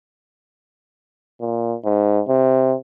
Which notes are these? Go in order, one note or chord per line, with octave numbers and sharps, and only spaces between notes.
A#2
G#2
C3